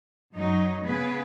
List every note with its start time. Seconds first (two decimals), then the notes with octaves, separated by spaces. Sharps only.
0.34 F#2 F#3 D#4
0.86 C#3 B3 G#4 B4